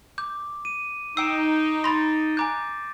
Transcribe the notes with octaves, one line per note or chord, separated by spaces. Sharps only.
D6 G6
D#7
D#4 G5 E6 C7 D7 E7
B5 C6 A6 A#6
G#5 A#5 D6 F#6 G6